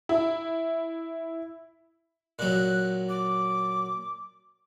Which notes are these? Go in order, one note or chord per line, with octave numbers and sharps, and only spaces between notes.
E4
A#2 F#3 F#6
D6